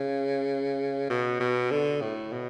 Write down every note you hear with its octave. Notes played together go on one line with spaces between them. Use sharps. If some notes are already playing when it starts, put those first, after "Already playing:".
Already playing: C#3
B2
B2
D3
A2
B2